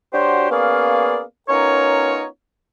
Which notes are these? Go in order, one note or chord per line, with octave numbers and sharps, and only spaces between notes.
F#3 D4 F#4 G4 C5
A#3 B3 C#4 G#4 D5 F5
B3 C#4 D#4 F4 A#4 C#5